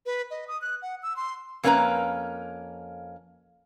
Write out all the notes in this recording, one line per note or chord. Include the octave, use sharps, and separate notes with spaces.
B4
D#5
D#6
F#6
F#5
E6
C6
F2 A#3 C#4 E4 B4 A#5